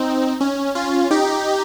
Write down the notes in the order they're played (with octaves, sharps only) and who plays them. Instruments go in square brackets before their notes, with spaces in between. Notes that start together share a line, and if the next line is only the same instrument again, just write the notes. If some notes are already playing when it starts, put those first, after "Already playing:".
Already playing: [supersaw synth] C4 D#4
C#4
C#4 F4
D#4 G4